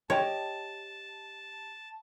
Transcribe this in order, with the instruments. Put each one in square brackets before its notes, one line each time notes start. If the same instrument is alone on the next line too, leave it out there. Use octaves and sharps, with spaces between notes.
[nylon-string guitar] G4 D#5 G5 [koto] C#5 [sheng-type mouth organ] A5